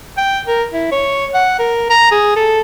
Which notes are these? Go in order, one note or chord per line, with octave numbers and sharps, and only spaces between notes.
G5
A#4
E4
C#5
F#5
A#4
A#5
G#4
A4